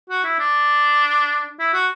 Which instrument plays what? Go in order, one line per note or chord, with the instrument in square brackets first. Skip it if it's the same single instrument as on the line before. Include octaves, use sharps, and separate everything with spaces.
[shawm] F#4
E4
D4
E4
F#4